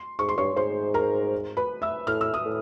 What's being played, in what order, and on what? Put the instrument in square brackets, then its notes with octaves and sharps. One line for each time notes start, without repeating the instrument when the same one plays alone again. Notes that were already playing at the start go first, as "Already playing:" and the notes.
Already playing: [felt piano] C6
[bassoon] G#2 [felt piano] C#6
[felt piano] C6
[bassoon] G2 [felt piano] C#5 C#6
[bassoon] G#2 [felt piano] C5 C6
[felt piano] A#4 A#5
B4 B5
E5 E6
[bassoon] A2 [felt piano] F6
[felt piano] E6
D#6
[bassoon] A2